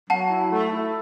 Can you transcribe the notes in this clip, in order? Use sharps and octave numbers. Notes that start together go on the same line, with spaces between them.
F#3 F#5 A5
E4
A3
E4